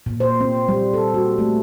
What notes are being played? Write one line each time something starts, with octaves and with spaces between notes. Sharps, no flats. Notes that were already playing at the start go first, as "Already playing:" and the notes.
A#2
C5
C4
G3
A4
F#4
A3